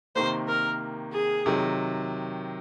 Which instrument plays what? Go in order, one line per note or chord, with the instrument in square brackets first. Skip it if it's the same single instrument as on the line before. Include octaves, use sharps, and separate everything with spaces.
[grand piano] C3 D#3 A#3 [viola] C5
[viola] A#4
G#4
[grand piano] C3 D#3 F#3